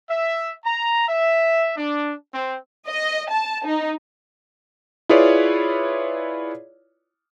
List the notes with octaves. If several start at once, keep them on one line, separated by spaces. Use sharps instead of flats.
E5
A#5
E5
D4
C4
D#5
A5
D#4
E4 F4 G#4 B4 C#5 D5